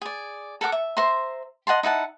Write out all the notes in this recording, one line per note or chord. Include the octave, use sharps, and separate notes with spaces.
G#4 D5
A4 A#4 F#5 D6
E5
C5 E5 A#5 C6
D#5 F#5 A5 C6
D#4 E4 F#5 A5